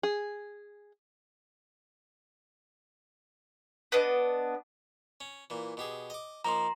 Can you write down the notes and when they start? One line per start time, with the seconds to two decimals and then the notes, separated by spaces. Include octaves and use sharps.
0.03 G#4
3.92 B3 D4 D#5
5.21 C#4
5.50 A#2 E3
5.77 B2 G4 G#4
6.10 D#5 D6
6.45 F3 A#3 D#4 A#5 C6